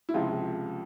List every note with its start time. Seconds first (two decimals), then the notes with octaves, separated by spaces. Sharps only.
0.09 E4
0.14 C#2 C3 F3 F4